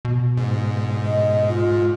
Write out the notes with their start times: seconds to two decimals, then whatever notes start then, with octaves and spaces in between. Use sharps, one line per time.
0.05 B2
0.37 G#2
1.05 D#5
1.48 F4